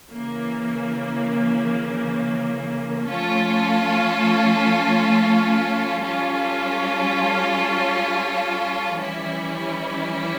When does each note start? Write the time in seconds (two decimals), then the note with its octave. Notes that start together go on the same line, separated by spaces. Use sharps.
0.10 C#3 E3 A#3
3.06 F3 A3 C#4 F4 A4
6.01 G3 C#4 F4 A4
8.95 E3 G3 C#4 E4